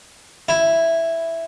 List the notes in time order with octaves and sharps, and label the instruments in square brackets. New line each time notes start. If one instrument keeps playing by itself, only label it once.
[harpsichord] E4